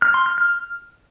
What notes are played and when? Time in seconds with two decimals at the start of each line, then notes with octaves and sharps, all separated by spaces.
0.02 F6
0.14 C6
0.26 F6
0.38 F6